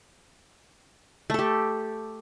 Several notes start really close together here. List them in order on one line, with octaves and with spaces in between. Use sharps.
A3 A4 G4